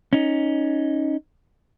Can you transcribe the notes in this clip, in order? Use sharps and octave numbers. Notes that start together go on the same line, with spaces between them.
C#4 D#4